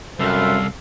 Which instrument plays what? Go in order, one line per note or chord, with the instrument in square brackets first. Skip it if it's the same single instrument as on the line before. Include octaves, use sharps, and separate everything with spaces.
[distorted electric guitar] C2 [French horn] F#2 [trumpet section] F4 B4 E5 [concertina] A4 F5